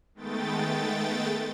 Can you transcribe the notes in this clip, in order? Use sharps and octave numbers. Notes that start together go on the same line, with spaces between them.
D#3 G#3 A3 B3 G5 A6